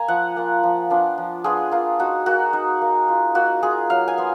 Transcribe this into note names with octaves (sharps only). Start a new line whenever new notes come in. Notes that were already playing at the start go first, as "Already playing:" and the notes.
Already playing: A#3 G#5 A#5
F3 F#5
A#3 F4
F3
B3 D4 F4
F3
B3 D4 F4 G#4
A#3 F4
D#4 F#4
A#3 F#4
D#4
A#3
F4
A#3 F#4
F4 G#4
F#3 F5
G#5
B3 F4